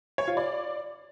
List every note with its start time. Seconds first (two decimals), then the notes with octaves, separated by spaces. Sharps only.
0.18 C#5
0.28 F4
0.37 D5